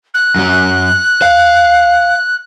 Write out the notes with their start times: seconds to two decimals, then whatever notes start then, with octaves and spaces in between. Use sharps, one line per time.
0.14 F#6
0.36 F#2 F#3
1.22 F5